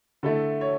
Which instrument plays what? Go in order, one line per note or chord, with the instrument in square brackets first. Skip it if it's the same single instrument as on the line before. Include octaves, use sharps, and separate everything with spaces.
[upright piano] D3 A3 E4 A4
C#5